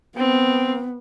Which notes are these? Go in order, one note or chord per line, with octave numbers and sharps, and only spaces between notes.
B3 C4